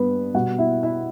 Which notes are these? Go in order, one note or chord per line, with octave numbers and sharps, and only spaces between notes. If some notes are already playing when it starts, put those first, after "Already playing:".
Already playing: G2 B3 B4
B2 G3 F#4 F#5
E4 E5
E4 E5